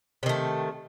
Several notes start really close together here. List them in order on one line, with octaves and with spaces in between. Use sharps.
C3 D#3 A3